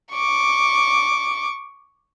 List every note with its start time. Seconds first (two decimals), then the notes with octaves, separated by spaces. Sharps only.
0.12 C#6 D6